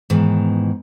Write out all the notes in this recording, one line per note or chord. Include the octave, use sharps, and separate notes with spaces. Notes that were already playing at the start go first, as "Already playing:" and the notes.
G#2 B2 D#3 E3